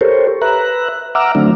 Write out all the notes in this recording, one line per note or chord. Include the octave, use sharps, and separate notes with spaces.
G4 A4 A#4 C5 C#5
B4 E5 A#5 F#6
E5 F#5 A#5 D6 E6 F6
D3 F#3 A3 C4 D4